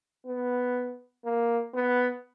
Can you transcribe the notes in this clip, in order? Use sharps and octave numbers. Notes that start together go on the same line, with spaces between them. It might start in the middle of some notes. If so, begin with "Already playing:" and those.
B3
A#3
B3